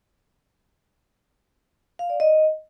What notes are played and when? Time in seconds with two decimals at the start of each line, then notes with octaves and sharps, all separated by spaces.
1.99 F5
2.10 D5
2.20 D#5